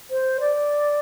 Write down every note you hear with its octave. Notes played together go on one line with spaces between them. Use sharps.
C5
D5